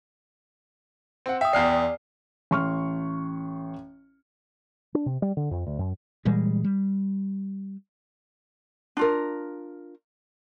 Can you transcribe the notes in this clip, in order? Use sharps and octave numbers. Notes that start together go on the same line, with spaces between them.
C4 F#5
E5 G5 D#6
E2 D5 F6 C7
A1 C6 C#6 F6
D4
C3
G3
D3
F2
D2
F#2
A#2 E3 G3 G#3
G3
D4 F4 A#4